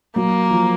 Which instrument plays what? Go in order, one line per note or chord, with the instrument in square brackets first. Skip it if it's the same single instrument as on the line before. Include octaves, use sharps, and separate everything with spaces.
[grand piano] F#3 [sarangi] A#3
[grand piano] F3